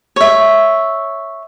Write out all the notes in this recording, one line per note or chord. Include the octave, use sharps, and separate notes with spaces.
C#5 E5